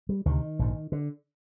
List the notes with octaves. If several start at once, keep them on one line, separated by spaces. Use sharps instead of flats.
G3
D2 C3 D#3
A#1 G#2
D3